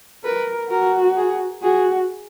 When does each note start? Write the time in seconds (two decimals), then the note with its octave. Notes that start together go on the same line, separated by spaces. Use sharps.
0.24 A#4 B4
0.71 F#4 A#4
1.17 G#4
1.63 F#4 G#4